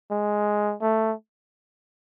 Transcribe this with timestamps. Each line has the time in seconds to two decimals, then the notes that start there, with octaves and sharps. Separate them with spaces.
0.11 G#3
0.82 A3